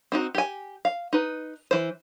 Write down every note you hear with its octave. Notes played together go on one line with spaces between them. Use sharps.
C4 D#4 F#4
G4 G#5
F5
D#4 B4
E3 C5